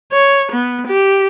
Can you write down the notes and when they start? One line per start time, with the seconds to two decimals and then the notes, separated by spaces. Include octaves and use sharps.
0.12 C#5
0.52 B3
0.87 G4